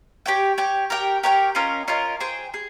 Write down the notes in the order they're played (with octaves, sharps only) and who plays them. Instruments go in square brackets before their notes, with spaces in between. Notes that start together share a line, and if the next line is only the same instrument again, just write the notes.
[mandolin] G4 C#5 G5
G4 C#5 G5
G4 A#4 C#5 G5
G4 A#4 C#5 G5
C#4 F4 A#4 D#5
C#4 F4 A#4 D#5
G#4 C5 G5
G#4